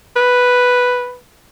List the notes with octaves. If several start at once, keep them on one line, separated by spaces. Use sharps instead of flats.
B4